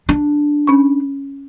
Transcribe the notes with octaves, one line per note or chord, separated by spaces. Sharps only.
D4
C#4 C#6